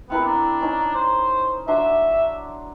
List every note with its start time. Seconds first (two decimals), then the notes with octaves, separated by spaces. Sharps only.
0.10 B3 C4 E4 A#4
0.25 D4
0.61 C#4 D#4
0.95 C5
1.68 F#3 D4 E5 C6